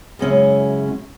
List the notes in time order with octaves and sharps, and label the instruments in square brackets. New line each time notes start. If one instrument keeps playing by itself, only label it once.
[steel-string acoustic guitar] F#2 C#3 G#3 C#4 E4